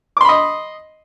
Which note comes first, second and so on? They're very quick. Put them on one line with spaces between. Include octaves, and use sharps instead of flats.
D6 C6 B5 D#5